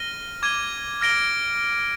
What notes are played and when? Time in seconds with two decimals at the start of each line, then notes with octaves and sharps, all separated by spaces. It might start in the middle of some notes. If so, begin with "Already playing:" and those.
Already playing: F6 A#6 D#7 G7
0.43 D6 G#6 D#7 G7
1.01 F6 A#6 D7 G7